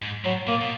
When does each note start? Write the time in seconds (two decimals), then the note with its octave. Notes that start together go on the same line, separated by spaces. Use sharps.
0.02 G#2
0.24 A2 F#3
0.47 A#2 A#3
0.61 B2